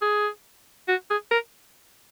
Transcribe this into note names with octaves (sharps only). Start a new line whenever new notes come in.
G#4
F#4
G#4
A#4